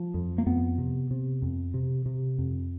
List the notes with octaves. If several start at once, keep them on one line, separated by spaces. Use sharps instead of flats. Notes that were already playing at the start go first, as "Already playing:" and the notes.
Already playing: F3
F2
A#3
F2 B3
C3
C3
F2
C3
C3
F2